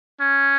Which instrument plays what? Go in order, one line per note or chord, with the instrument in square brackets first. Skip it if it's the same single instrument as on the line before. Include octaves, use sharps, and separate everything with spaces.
[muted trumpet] C#4